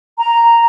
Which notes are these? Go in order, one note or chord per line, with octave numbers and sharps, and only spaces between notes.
A#5